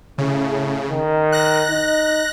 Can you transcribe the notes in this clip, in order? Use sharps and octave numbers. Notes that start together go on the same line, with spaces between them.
A2 C#3
D#3
F#6 A#6
D#4